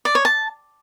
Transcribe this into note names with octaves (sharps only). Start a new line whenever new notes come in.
D5
C#5
A5